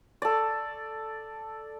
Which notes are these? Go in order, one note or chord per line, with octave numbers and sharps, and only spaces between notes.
A4 D5